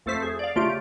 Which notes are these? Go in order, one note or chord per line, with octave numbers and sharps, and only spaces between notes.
F2 A3 A4 C5 B6
G#4
D5 F5
C#3 A3 F4 G4 D7